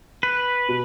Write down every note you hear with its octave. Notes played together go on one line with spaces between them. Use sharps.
B4
B2